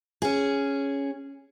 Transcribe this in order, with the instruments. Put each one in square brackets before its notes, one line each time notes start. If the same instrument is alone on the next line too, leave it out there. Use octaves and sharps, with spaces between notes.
[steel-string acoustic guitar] C#4 G#4